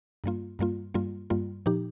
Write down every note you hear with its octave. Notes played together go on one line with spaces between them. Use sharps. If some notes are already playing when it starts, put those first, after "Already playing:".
G2 G3 A#3 F4
G2 G3 A#3 F4
G2 G3 A#3 F4
G2 G3 A#3 F4
A#2 F3 D#4 G4